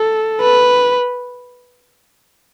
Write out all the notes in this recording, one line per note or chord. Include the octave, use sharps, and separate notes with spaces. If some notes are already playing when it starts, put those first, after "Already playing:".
Already playing: A4
B4